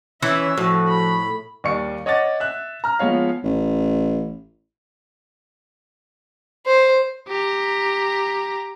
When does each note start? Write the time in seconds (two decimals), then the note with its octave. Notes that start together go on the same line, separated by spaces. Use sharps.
0.22 E3 C#4 C#5 E5
0.58 A2 F3 F#4
0.88 B5
1.64 D#2 G3 D5 C#6 C#7
2.06 C#5 D#5 F#5 D6 A6
2.40 E5 F#6
2.84 A#5 F6
2.99 F3 G#3 B3 C#5 F5
3.44 A1
6.66 C5
7.28 G4 A#5